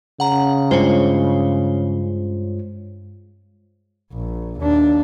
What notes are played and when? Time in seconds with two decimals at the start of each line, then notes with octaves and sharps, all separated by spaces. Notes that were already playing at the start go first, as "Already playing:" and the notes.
0.20 C#3 F#5 A#5
0.71 G2 G#3 F4 C5 C#5
4.13 A#1
4.59 D#2 D4